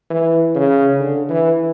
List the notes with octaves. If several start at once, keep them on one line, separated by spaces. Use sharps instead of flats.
E3
C#3
D3
E3